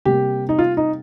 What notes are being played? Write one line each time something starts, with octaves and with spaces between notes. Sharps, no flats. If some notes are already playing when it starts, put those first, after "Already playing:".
C3 G3 A#3 G4
D#4
F4
D#4